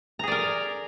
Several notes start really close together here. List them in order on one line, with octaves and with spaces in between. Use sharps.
A#5 G#4 D5 A#4